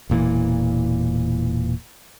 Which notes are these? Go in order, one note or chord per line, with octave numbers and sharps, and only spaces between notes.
E1 A#2 E3